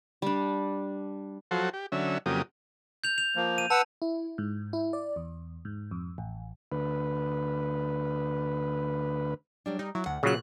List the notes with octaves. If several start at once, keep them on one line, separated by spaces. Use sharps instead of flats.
G3 D4
F3 F#3 F#4 A4 C5
G4
D3 F#3 C#4 E5
F2 C#3 F#3 A#3 G4 D#6
G6 F7
F7
F3 A#3
D#7
B4 F#5 A5 E6
E4
G#2
E4
D5
E2
G#2
F2
A1
D2 B4
F#3 G3 D4
G3 D#4
F#3 E4
D2 F#5
A#2 C#3 F#3 C#4 F4 F#6